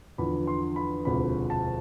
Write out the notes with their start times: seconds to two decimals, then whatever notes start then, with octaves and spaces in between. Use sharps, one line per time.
0.18 E2 D3 F3 B5
0.47 C6
0.76 B5
1.05 E1 D2 C3 F3 B5
1.50 A5